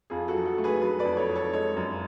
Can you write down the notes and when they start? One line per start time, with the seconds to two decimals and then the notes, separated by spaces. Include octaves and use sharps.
0.10 F2 F4 G#4
0.28 F#4 A4
0.35 F#3
0.46 F#4 A4
0.58 A3
0.64 G#4 B4
0.82 F#3 G#4 B4
0.99 B4 D5
1.05 F2
1.17 A4 C#5
1.29 F2
1.35 A4 C#5
1.53 G#3 A4 C#5
1.76 F#2